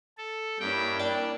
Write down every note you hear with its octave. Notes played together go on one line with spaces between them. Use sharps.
A4
G2 A#3 C#4 E4 G5
D4 D5 G5